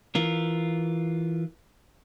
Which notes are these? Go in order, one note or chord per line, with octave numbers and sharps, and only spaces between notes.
E3 F4 A#4